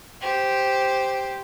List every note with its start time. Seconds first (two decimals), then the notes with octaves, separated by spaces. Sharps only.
0.21 G4 C5